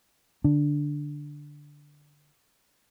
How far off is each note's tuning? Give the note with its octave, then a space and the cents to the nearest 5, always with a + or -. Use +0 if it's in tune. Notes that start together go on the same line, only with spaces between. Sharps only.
D3 +0 D4 +0